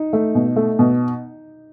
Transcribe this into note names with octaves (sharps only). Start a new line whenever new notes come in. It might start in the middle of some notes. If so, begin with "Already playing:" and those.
Already playing: D#4
A3
B2
A3
B2